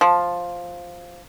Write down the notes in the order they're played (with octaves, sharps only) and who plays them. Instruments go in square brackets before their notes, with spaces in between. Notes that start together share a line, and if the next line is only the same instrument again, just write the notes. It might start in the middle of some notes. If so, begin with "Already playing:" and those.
[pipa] F3